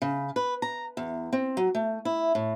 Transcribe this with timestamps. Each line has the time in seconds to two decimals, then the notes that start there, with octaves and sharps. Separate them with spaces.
0.02 C#3
0.36 B4
0.62 A#5
0.97 E2
1.33 C4
1.57 F#3
1.75 A3
2.05 E4
2.35 A2